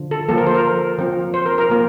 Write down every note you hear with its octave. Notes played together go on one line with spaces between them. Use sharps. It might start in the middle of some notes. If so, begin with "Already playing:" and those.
Already playing: D3 F3
A4
F3 A#3 A4
A#4
C5
A#4
F3 C4
C5
A#4
A#4
F3 A#3